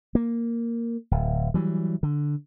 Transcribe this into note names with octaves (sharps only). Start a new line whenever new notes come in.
A#3
D1
E3 F#3 G3
D3